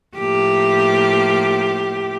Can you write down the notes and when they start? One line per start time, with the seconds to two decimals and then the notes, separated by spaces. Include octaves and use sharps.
0.17 A2 F3 A#3 G4